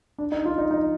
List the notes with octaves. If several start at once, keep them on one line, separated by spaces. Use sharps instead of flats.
D4
D#4
F4
D#4
D#4